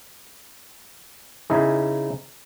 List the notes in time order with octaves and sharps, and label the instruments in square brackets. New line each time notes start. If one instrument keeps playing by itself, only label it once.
[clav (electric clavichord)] C#3 D#4 E4 G#4